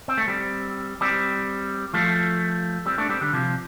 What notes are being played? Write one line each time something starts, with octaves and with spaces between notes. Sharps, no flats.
C4
A3
G3 C4
G3 C4
F3 A3
G3 C4
A3 D4
G3 C4
D3 G3
C3 F3